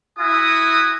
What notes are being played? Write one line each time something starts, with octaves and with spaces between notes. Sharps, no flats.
E4 F#4 G#5 D#6